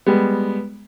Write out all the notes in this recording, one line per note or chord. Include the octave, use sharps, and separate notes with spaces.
G3 G#3 B3